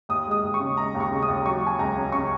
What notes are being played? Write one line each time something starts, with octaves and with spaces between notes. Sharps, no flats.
D#2 D#6
G#3 D#6
D#2
C#6
C#3
G#3 A#5
D#2
C#6
C#3
D#6
D#2
F#3 C#6
F#3 G#5
C#2 A#5
C#3
C#3 C#6